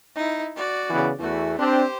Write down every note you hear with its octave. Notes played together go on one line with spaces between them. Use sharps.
D#4 E4
F#4 D5
C#3 E3 B3
E2 E3 A3 F#4
C4 D4 G4 C5